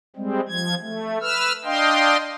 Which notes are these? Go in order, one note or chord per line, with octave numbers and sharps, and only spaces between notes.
G3 G#3 C4
F3 G#6
A3
B4 E6 F6
D4 D#5 F5 G5 C6